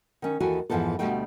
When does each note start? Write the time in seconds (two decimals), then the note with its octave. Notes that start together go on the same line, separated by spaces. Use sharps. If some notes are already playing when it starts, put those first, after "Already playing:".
0.22 D#3 C#4
0.40 D#2 E3 F#4 A4 G#5
0.70 F2 G#2 E3 F3 B3 A4
0.99 D2 G2 B2 G3 A3 G5